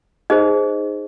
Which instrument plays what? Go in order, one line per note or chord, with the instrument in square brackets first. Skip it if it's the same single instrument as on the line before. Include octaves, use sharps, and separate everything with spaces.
[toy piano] D#4 G#4 C5 D#5